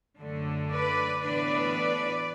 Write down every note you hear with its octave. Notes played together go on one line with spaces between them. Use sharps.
F#2 D3 A3
B4 D5
A2 E3 B3 D4 B4 D5